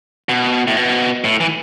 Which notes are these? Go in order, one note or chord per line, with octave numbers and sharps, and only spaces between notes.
B2
A2
B2
A2
E3